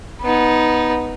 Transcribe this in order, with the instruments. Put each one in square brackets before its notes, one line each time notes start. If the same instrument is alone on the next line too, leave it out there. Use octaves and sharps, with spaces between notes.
[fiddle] B3 D#4